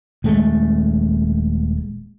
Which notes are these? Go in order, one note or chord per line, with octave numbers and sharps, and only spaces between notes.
D#1 G#3 A3